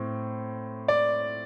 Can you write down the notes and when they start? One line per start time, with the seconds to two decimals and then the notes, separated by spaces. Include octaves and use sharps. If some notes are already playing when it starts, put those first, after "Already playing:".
Already playing: A2 C4
0.88 D5